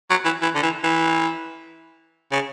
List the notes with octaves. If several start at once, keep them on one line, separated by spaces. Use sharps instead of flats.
F#3
E3
E3
D3
E3
E3
C#3